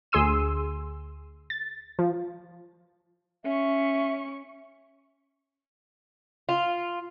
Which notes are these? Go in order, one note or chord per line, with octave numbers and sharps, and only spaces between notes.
D2 G#4 C6 E6 D#7
A6
F3
C#4 E5 C#6
F4